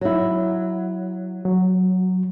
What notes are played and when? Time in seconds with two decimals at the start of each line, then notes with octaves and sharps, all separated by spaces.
0.01 F#3 E4
1.45 F#3